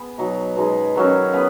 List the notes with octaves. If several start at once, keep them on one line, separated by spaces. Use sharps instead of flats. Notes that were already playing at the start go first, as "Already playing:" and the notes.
Already playing: B3 G#4
B2 F#3 D#4
B2 G#3 D#4
D#3 F#3 C#4
B3 G#4 B4